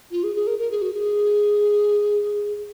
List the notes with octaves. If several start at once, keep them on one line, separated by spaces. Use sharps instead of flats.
F4
G#4
G#4
A#4
A#4
G#4
F#4
G#4